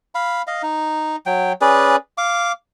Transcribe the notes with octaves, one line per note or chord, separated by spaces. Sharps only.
F5 B5
D#5 F5
D#4
F#3 G5
C#4 G#4 B4 D5
F5 D6